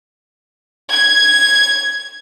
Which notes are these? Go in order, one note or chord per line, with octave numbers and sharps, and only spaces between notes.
G#6